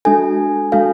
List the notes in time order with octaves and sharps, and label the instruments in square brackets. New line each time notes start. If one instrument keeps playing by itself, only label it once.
[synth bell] G#3 D4 F#4 A4 [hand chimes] G#5
[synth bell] G#3 D4 F#4 A4 [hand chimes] F5